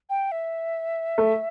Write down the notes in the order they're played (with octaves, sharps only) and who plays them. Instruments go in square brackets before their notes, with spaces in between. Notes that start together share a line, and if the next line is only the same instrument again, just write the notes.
[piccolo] G5
E5
[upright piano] A3